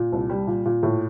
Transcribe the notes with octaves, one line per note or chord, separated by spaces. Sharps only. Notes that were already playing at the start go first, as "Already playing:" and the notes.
Already playing: A#2
C2
G3
A#2
A#2
A2